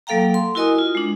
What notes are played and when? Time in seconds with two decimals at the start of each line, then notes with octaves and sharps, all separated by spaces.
0.07 F#3 A#3 A4 F5 G5 A#5
0.34 C6
0.55 E4 F#4 A#4 D#5 G#5 D#6
0.78 F4
0.95 G#3 D4